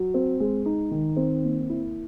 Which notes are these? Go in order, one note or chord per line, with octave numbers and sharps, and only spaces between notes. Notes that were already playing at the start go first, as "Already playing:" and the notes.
Already playing: F#3
C4
G#3
D#4
D#3
C4
A#3
E4